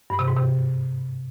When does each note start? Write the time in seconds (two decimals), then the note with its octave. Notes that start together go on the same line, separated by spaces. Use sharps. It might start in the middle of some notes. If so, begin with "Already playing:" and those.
0.10 G2
0.19 C3
0.28 G#2
0.36 C3